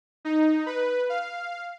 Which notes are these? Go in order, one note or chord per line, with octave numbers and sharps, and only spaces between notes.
D#4
B4
F5